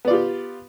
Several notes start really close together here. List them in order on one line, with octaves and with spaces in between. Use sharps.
B3 D5 F4 G4